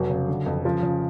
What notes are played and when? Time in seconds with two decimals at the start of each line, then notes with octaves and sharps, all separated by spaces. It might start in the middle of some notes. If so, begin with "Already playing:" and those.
Already playing: F1 F#3
0.10 C#3
0.28 D3
0.46 F2
0.65 C#3 F3
0.83 C#3